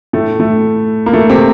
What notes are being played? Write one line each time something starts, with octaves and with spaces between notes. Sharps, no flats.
A2 A3
A3
A#3
A3
C3 C4